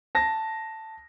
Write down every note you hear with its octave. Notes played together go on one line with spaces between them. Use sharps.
A5 A#6